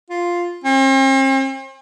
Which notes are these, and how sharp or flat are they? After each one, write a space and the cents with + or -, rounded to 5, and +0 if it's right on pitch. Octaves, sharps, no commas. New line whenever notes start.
F4 +0
C4 +45